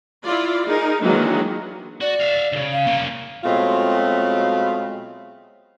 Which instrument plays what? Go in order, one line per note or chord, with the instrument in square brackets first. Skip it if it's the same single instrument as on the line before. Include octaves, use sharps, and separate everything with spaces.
[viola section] E4 F4 D5
D#4 G#4 A#4
D#3 E3 F#3 G#3 A#3 D4
[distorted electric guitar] F#4 [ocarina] D5
[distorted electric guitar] E5 F5
D2 C#3
[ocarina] F5
[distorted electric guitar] A#3 C#4
[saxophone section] B2 F#3 G#3 A3 C4 F4